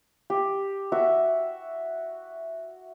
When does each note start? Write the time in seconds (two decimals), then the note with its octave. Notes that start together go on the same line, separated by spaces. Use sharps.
0.30 G4
0.92 F#4 E5